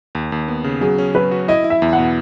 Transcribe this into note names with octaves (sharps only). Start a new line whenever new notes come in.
D#2
D#2
B3
C#3
F#3 G#4
C#4
F#3 B4
F#4
E4 D#5
E4
E5
E2
F#5
B2